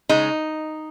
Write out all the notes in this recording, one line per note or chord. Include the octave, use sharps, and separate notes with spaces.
C#3 G#3 D#4